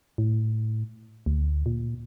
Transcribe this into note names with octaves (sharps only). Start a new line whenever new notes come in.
A2
D2
A#2